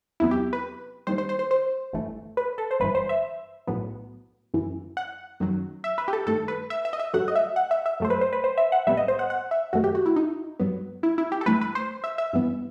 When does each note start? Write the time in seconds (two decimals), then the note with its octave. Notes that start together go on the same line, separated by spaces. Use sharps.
0.20 E2 C3 F#3 B3 E4
0.31 G4
0.53 B4
1.07 D#2 D#3 G3 C5
1.18 C5
1.29 C5
1.39 C5
1.51 C5
1.93 G1 G2 E3 A3
2.37 B4
2.58 A4
2.71 C5
2.80 G1 G2 E3 B4
2.95 C5
3.09 E5
3.67 B1 A2 F#3 B3
4.54 G1 F#2 E3
4.97 F#5
5.40 F#2 D#3 F#3
5.84 E5
5.98 B4
6.08 G4
6.13 A4
6.27 G2 D#3 A3 A4
6.48 B4
6.70 E5
6.85 E5
6.93 D#5
6.99 E5
7.14 G2 F#3 A3 F#5
7.28 D#5
7.35 E5
7.56 F#5
7.71 E5
7.86 E5
8.00 F#2 F#3 A3 C5
8.10 B4
8.21 C5
8.33 B4
8.44 C5
8.58 E5
8.72 F#5
8.87 B1 A2 G3 B3 E5
8.97 D#5
9.08 C5
9.19 F#5
9.30 F#5
9.51 E5
9.73 F#2 D#3 A3 F#4
9.84 G4
9.95 F#4
10.06 E4
10.16 D#4
10.60 G2 F#3 B3
11.03 E4
11.18 E4
11.32 G4
11.41 A4
11.46 G2 E3 A3 B4
11.61 B4
11.75 C5
12.04 E5
12.18 E5
12.33 G2 E3 B3